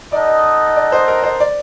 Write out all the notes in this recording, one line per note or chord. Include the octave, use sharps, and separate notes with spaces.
D#4 A4 D5 D#5 F#5
D5
C5
A#4
C5
D5